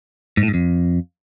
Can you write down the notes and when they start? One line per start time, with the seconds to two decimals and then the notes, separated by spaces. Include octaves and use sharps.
0.37 G#2
0.43 A2
0.48 G#2
0.54 F2